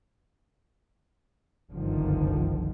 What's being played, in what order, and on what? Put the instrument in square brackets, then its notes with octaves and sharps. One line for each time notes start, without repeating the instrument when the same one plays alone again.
[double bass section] F#1 C2 G2 D3 D#3 F3